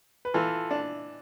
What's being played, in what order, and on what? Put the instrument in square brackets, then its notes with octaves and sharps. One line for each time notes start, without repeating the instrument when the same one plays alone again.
[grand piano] B4
[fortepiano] E3 [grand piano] F4 A4
[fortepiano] D4